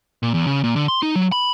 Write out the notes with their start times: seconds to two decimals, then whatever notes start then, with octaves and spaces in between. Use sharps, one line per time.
0.23 A#2
0.34 E2
0.47 C#3
0.64 A#2
0.76 D3
0.88 C6
1.03 D#4
1.16 F#3
1.32 B5